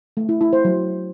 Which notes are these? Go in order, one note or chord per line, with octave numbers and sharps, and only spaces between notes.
A3
E4
E4
C5
F#3